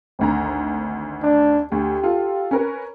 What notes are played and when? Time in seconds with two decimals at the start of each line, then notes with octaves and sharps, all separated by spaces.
0.19 G#1 D2 A#5
1.23 D4
1.72 D2 G4
2.03 F4 A4
2.51 C#4 A#4 B4